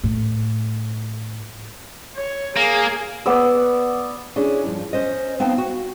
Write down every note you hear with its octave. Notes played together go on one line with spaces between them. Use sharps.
A2
C#5
A#3 G#4
B3 D5 E6
C#4 D4 E4 G#4
G2 F3
C#4 C5 D#5
B3 C4 D#4 F5 G5 A5
F#4